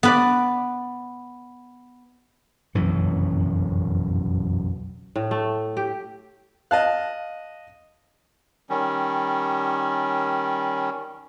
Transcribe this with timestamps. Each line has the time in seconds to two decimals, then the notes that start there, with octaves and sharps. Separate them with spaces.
0.03 B3 B4 D5
2.75 F1 B1 F#2 C#3 E3
5.16 A2
5.31 A3
5.77 G4
6.71 D#5 F5 A5 F#6
8.70 D#3 G3 C#4